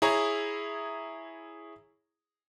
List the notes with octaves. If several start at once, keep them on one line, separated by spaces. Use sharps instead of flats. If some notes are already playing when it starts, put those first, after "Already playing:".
E4 G#4 C#5 A#5